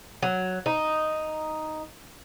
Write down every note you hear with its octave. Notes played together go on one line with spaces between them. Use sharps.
F#3
D#4